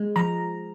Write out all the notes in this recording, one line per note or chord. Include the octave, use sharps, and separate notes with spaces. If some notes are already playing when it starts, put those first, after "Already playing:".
Already playing: G#3
F3 A#5